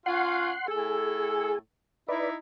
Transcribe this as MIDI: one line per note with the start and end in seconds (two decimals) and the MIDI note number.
0.06 0.51 61
0.06 0.51 65
0.06 0.67 78
0.06 0.67 84
0.68 1.53 45
0.68 1.59 68
0.68 1.53 69
2.08 2.35 63
2.08 2.35 64
2.08 2.30 71
2.08 2.30 74